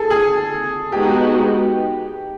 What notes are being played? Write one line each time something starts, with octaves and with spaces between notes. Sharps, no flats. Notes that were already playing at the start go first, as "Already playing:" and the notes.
Already playing: G#4 A4
G#4
G#3 B3 D#4 F#4 G4